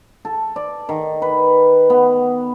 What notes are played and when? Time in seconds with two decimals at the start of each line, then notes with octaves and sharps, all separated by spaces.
0.25 A4
0.56 D5
0.89 D#3
1.22 B4
1.90 B3